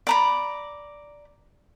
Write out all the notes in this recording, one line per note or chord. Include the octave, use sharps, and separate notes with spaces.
D5 A#5 B5